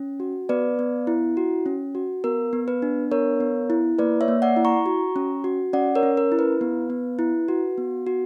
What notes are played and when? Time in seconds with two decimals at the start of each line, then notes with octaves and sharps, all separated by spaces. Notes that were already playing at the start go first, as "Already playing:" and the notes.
Already playing: C#4
0.20 F#4
0.49 B3 B4 D5
0.79 B3
1.07 E4
1.37 F#4
1.66 C#4
1.95 F#4
2.24 B3 A#4
2.53 B3
2.68 B4
2.82 D4
3.11 B3 A#4 C#5
3.40 B3
3.70 E4
3.98 A#3 B4 D5
4.21 C#5 E5
4.28 A#3
4.42 D5 F#5
4.56 E4
4.65 A#5 C#6
4.86 F#4
5.16 C#4
5.44 F#4
5.73 C#4 D5 F#5
5.95 A#4 C#5
6.03 C#4
6.17 A#4
6.32 E4
6.39 B4
6.61 B3
6.90 B3
7.19 E4
7.48 F#4
7.78 B3
8.07 F#4